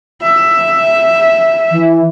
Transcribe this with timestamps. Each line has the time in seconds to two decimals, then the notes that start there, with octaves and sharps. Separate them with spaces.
0.22 E5
1.71 E3